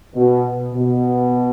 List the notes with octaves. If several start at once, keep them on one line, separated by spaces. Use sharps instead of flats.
B2
B2